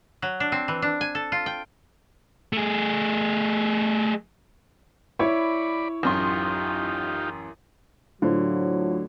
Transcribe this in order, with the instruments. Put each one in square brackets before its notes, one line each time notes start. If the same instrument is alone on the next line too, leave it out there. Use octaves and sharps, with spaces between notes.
[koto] F#3
D4
C4
E3
D4
G#5
A4
F4
G5
[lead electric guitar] A3 G#4
[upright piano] E4 C#5 C#6 [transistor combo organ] D5 B5
[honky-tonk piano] A1 F#2 C6 [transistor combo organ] D#4 F4 G4
[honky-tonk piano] A2 [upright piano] D3 [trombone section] F#3 [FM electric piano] F4 C5